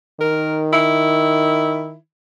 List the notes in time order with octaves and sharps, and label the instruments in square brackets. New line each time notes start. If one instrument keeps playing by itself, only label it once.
[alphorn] D#3 [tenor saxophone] A#4
[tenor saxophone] E4